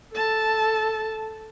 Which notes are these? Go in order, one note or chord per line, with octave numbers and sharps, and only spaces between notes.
A4 A5